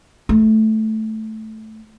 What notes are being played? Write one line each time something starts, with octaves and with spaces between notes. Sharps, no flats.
A3